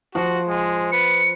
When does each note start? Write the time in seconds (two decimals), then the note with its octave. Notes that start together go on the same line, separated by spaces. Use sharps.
0.15 F3 F#4
0.48 G#3
0.92 B4 C#7